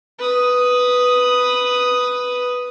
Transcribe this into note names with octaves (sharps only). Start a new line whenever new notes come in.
B4 D#6